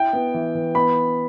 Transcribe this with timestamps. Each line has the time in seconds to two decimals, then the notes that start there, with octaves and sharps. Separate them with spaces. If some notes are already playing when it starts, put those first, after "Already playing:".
Already playing: E4 G5
0.13 B3
0.34 E3
0.55 E3
0.75 B3 B5